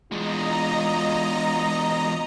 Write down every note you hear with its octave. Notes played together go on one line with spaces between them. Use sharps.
E2 G#3 F4 D#5 A#5